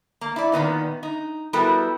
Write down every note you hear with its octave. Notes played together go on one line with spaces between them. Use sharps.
A#3
E4 D5
A#2 D#3 B3 D#4
D#4
G3 B3 E4 F#4 A4 A#4